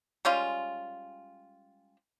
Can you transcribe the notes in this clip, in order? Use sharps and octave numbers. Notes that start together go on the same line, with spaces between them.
G3 G#3 C#4 F4